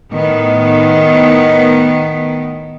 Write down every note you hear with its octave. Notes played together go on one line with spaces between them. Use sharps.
A2 D#3 B3